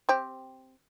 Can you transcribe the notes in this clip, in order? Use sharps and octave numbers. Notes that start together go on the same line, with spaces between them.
C4 G4